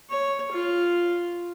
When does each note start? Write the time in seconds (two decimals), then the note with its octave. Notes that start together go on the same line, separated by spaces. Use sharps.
0.10 C#5
0.51 F4